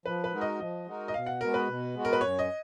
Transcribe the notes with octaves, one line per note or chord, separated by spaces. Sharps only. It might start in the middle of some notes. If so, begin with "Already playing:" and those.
F3 B4
B4
G#3 D#4 F#4 A#4
D#5
F3 D#5
G#3 D#4 F#4 A#4
D#5
B2 F5
F#5
G#3 B3 F#4 A#4
B4
B2
G#3 B3 F#4
A#4
B4
F#2 C#5
D#5